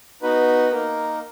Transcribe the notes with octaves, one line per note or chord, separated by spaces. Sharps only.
B3 D#4 F#4 B4
A#3 D#4 A#4